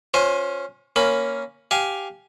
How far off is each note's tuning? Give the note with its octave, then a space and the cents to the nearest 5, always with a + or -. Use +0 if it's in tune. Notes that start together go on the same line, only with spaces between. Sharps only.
C#4 +0 F4 +35 C5 +0
A#3 +0 C#4 +0 B5 +15
G4 +0 F5 +0 G#5 +10